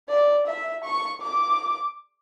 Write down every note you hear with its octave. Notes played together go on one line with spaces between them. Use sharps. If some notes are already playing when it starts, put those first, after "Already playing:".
D5
E5
C#6
D6